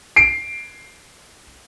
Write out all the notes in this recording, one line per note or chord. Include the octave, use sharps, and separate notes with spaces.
C7 D7